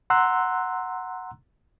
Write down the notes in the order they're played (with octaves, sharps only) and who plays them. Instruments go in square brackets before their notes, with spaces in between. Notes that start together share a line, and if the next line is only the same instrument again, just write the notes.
[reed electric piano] F#5 A#5 C6 E6 F#6